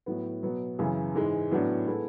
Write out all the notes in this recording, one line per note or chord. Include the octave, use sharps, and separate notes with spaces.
A2 F#3 B3
B2 F#3 B3
F#2 C#3 E3
G#2 E3 G#3
A2 F#3 B3 D4
G#3 B3 E4 A4